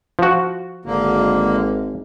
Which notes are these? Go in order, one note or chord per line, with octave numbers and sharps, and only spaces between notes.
F3 F#4
G#1 D3 A#3